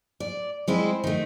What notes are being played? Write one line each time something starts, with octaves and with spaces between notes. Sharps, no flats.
D5
G#3 C4 E4
D#3 A3